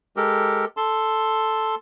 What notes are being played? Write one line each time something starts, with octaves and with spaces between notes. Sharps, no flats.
G#3 G4 A4 A#4
A4 A5 C6